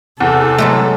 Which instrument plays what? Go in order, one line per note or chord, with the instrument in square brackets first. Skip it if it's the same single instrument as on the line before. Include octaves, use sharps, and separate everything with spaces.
[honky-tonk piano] E2 [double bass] C3 [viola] A4
[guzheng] F#3 G#3 A3